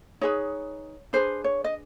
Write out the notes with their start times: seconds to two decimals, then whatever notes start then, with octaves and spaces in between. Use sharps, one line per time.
0.21 D#4 G#4 B4 C#5
1.13 D4 F4 G#4 B4 C5
1.44 C#5
1.64 D#5